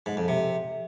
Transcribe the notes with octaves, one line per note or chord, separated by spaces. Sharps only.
G#2
F2
C3